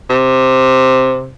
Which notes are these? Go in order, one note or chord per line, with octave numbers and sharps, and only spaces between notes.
C3